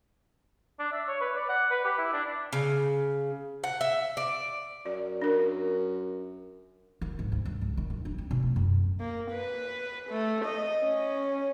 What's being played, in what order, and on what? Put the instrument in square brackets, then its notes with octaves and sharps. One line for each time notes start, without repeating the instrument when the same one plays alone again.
[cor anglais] D4
E5
C#5
B4
D5
F#5
B4
G4
E4
D4
[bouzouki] C#3
F#5
E5
D5
[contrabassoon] F#2 [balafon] D5
[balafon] D4 A#4
[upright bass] D#3
G#2
D2
G2
C#2
D#3
D1
D4
C4
B2
A3
F#2
[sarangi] A#3
B4
A3
D#5
C#4